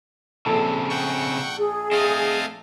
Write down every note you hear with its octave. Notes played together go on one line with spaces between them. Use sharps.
A#1 C#3 C4 A4 A5
F#5 G5 C#6
G#4
A3 C4 D#5 F5 G#5